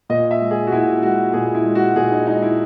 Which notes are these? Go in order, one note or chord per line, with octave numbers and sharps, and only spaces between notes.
A#2 D#5
E5
G#3
G#4
F#4
A#2 E4
G#3 F#4
A#2 G#4
E4
G#3
F#4
A#2 G#4
D#4
G#3 D#4
E4